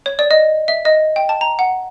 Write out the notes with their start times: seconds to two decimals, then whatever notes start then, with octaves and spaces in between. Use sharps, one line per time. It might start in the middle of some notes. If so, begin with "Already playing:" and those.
0.06 C#5
0.19 D5
0.31 D#5
0.68 E5
0.85 D#5
1.16 G5
1.29 A5
1.41 A#5
1.59 F#5